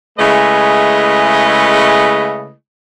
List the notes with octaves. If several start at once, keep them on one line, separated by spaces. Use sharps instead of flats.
C#3 G#3 A3 E4 B4 D#5